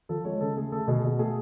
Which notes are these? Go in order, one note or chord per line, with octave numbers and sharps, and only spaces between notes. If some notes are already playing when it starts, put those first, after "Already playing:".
F3 A4
G#3 A4 C#5
C#3 A4
A3 G#4
A3 A4
B2 G#4
B2
A3 G#4